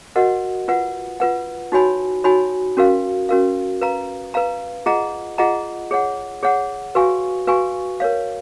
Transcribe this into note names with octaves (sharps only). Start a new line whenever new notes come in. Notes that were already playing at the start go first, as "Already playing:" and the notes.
F#4 A#4 D#5 F#5
F4 B4 F#5
F4 B4 F#5
D#4 F#4 C#5 G#5 B5
D#4 F#4 C#5 G#5 B5
C#4 F#4 A#4 F5
C#4 F#4 A#4 F5
B4 F5 A#5
B4 F5 A#5
F4 G#4 D#5 F#5 A#5
F4 G#4 D#5 F#5 A#5
G#4 C#5 F#5
G#4 C#5 F#5
F#4 B4 F5 G#5 C#6
F#4 B4 F5 G#5 C#6
A#4 C#5 F5